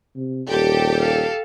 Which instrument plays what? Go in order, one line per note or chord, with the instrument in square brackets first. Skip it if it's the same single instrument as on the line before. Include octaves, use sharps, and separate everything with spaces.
[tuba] C3
[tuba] D#1 [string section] G4 [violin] A4
[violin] A4 F5